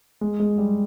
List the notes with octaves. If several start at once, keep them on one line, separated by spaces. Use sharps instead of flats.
G#3
G#3
G3